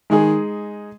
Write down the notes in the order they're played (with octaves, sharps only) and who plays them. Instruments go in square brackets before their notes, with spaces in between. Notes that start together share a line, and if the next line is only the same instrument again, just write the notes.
[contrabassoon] D#3 [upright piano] G#3 D#4 G#4